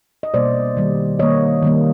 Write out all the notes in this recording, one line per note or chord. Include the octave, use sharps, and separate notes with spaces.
D#5
B2 G3 A#3 C5 D5
D#3 G3 A#3
D#3 G3 A#3 C#5 D#5
D#3 G3 A#3